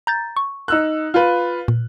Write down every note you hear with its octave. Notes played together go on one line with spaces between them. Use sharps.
A#5 G6 A6
C#6
D#4 E6 F#6
F4 B4
A#2